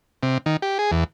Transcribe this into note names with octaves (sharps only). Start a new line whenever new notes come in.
C3
D#3
G4
G#4
E2